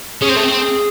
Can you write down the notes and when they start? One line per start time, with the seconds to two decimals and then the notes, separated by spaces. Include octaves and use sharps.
0.22 C#4 G#4
0.29 C4
0.36 A3
0.43 C4